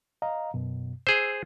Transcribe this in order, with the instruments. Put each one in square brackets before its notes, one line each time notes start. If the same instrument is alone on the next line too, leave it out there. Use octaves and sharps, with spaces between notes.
[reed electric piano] D#5 F5 A#5
F#2 B2
[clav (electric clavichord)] G#4 C5 [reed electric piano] E6